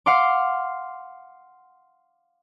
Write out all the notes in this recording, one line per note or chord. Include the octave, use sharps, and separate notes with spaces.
F5 F#5 C6 D6